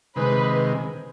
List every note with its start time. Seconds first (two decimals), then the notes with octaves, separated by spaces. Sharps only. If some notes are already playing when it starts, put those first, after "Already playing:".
0.16 C3 D#3 G#3 B4